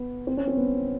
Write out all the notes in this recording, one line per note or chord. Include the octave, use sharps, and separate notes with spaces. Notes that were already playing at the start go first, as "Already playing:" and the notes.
Already playing: B3
C4
C#4
C4
B3